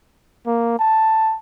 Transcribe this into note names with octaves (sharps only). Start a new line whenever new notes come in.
A#3
A5